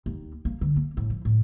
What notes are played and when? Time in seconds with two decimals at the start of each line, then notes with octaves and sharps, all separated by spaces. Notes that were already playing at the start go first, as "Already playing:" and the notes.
0.06 D#2
0.45 A#3
0.61 D3
0.76 A#3
0.97 A2
1.10 F3
1.25 A2